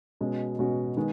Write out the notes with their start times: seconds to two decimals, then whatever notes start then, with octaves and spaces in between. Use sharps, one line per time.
0.21 B2 G#3 C#4 F#4
0.58 B2 G#3 C#4 F#4
0.97 D#3 G#3 B3